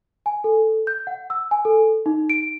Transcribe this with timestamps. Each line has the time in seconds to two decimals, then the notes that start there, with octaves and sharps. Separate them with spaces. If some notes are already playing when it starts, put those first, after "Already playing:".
0.26 G#5
0.44 A4
0.87 G6
1.07 F#5
1.30 E6
1.51 G#5
1.65 A4
2.06 D#4
2.30 D7